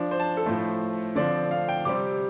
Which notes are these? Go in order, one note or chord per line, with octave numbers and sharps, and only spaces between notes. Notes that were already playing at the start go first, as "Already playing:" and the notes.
Already playing: F3 D4
C5
A5
A4
A2 F3 A3 C5
D3 F3 C4 D5
F5
G5
C3 G3 C4 D6